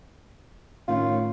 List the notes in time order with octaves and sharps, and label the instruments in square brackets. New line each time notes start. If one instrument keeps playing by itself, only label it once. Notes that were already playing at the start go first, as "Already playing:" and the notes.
[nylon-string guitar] A2 D#3 C#4 [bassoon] F4